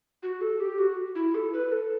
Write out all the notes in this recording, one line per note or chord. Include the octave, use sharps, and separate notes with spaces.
F#4
A4
G4
F#4
E4
A4
B4
A4